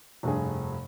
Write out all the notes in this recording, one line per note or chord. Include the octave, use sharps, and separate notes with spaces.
F1 G2 G#4